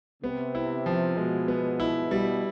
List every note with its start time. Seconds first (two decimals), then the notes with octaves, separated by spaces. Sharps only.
0.23 C3 B3
0.55 E4
0.86 F3
1.17 B2 G#3
1.48 B3
1.80 E4
2.11 B2 G3